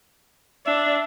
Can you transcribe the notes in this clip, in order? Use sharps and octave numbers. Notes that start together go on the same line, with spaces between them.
D4 E5